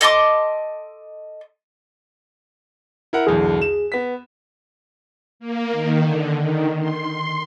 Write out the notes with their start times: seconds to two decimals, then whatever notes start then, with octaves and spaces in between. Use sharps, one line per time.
0.01 A4 D#5 C6 D6
3.13 E4 A#4 F#5
3.27 B1 E2 D3 G#4
3.62 E7
3.92 B3 B6
5.40 A#3
5.72 D#3
6.04 D3
6.41 D#3
6.80 C6